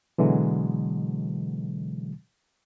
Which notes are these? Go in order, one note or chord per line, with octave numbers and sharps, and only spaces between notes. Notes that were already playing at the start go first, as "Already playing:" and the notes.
B2 D3 E3 F#3 G#3